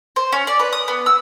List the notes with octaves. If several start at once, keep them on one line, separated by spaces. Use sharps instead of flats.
C5
C#4
D5
B4
D#6
B3
E6